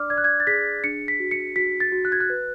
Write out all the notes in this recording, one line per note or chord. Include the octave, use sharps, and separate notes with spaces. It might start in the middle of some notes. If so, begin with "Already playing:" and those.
Already playing: D4 D5 D6 F6
D5 G#6
F#6
G#6
A6
G#4 B6
D4 C#7
B6
F#4
C#7
F#4 B6
A6
F#4
F#6
G#6
F#6
B4